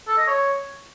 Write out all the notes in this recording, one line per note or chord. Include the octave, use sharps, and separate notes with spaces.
A4
D#5
C#5